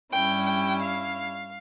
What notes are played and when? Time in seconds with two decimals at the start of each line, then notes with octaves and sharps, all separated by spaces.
0.12 G2 G3 C#4 E4 G5
0.46 G5
0.81 F5